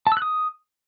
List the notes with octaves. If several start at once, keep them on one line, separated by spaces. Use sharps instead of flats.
A5
E6
F#6
D#6